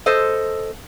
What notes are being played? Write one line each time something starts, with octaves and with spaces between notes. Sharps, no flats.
A4 C5 D#5